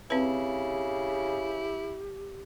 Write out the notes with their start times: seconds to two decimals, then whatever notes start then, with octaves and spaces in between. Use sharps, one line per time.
0.10 C#3 C4 E4 G4 B4